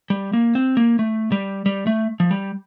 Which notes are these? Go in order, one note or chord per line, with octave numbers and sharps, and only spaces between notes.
G3
A#3
C4
A#3
A3
G3
G3
A3
F3
G3